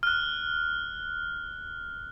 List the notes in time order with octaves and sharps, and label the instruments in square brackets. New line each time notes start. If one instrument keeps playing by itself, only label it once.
[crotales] F6 F#6